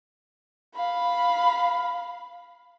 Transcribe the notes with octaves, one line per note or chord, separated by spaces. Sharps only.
F5 B5